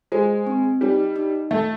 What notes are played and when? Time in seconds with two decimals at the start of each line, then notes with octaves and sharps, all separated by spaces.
0.12 G#3 C5
0.47 C4
0.81 G3 D#4
1.16 D#4
1.51 A3 E5